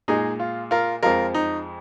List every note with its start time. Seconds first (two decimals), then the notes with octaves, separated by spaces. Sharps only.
0.08 A#2 G#3 D#4 G#4
0.40 F4
0.71 F4 A#4
1.03 F2 F3 G#3 F4 A#4
1.34 D#4